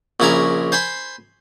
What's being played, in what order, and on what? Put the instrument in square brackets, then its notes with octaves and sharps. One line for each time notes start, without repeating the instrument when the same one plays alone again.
[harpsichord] A#1 C#3 E4 A#4 G#5 A#5
C5 G#5 B5 C6